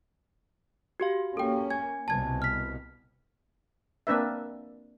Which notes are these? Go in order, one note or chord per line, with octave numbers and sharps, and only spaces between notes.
F#4 G4 F5
A#3 C#4 A4 G5
G#5 G#6
C2 B2 A5 G#6
F6 B6
A#3 C4 D4 B4 E5